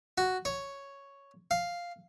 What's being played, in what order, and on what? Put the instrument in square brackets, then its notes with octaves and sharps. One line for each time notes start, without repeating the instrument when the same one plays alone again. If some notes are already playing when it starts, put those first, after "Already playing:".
[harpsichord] F#4
C#5
F5